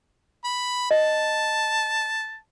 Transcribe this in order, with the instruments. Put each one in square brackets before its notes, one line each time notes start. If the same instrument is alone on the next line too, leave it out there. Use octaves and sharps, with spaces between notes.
[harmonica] B5
[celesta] D#5 [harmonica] A5